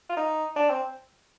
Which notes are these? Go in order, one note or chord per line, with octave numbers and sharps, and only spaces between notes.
F4
D#4
D4
C4